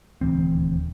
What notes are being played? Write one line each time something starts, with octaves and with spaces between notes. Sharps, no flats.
D#1 D2 E3 C4